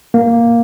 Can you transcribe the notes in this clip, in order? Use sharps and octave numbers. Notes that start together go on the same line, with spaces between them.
A#3